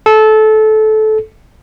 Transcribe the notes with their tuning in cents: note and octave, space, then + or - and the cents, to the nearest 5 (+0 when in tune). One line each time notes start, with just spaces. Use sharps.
A4 -20